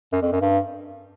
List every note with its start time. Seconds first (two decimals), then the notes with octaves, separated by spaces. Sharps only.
0.13 F#2
0.22 F2
0.32 F#2
0.41 G2